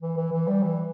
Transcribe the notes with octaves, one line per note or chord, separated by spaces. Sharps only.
E3
E3
E3
G3
E3